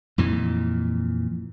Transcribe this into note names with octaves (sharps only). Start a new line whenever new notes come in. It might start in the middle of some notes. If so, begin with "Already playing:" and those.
F2 A#2 E3